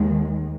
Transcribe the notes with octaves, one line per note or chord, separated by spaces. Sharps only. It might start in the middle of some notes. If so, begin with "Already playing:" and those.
Already playing: D#2 D#3 G#3